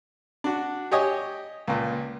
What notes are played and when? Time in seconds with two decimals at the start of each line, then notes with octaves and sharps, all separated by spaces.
0.44 D4 F#4
0.91 G4 C#5 D#5 G#5
1.67 C#2 A#2